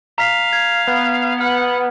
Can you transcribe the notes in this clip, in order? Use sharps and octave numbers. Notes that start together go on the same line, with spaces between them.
F5 A#5 B6
G#6
B3
F#5 F6